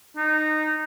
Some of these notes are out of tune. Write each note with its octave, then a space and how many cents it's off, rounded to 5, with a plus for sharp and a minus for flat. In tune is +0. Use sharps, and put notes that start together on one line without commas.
D#4 -15